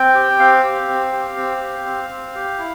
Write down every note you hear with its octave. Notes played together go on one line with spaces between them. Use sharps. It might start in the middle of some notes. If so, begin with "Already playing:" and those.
Already playing: C4 G5
G4
C4 F5
G4
C4
G4
C4
G4
C4
C4
G4
E4